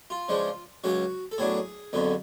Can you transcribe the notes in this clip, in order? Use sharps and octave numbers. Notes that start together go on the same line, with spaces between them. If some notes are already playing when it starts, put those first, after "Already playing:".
F4
C#3 F3 G#3 D4
C#2 C#3 F#3 C#4 F#4
A4
A2 F#3 B3 D4 G#4
F2 D3 F#3 B3